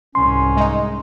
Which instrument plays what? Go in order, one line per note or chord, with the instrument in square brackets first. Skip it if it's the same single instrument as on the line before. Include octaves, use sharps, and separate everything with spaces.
[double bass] C2 G#2 [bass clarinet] C#4 [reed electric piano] C6
[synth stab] G#3 D#4